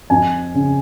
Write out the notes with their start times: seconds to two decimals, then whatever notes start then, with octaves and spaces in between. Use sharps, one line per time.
0.10 F2 G#5
0.55 C#3